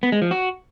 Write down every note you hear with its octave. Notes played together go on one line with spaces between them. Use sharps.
B3
G#3
F3
F#4